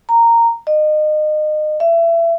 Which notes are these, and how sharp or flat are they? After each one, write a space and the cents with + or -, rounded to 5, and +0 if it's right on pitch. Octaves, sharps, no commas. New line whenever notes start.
A#5 -10
D#5 -30
E5 +30